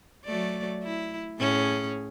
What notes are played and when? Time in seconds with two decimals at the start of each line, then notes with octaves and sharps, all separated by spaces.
0.25 F#3 A3 D5
0.83 E4
1.39 A2 C#4 G#4